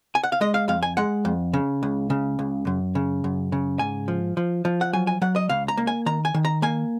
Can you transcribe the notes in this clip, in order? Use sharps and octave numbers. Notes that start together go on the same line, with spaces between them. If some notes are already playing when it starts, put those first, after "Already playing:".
G#5
F#5
F5
G#3 D#5
F5
F2 F5
G#5
G#3 F#5
F2
C#3
C#2
C#3
C#2
F#2
C#3
F#2
C#3
G#2 G#5
F3
F3
F3
F#5
F#3 G#5
G#5
F#3 F#5
D#5
C#2 F5
A#5
A#3
G#5
D#3 A#5
G#5
D#3
A#5
A#3 G#5